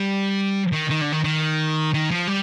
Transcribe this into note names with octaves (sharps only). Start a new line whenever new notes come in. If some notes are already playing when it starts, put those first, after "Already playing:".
Already playing: G3
D#3
D#3
D3
D#3
D#3
D#3
F3
G3